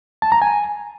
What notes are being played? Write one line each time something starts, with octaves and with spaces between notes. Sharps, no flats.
A5
A#5
G#5